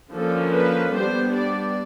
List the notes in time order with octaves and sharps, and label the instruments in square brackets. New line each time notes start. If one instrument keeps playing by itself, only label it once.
[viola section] D3 F3 A#3 C#4 A4
B4
G3 B3 D4 C5
D5